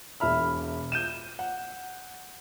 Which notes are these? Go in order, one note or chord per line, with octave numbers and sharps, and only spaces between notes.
E1 E5 B5 F6
G6 D#7 E7
F#5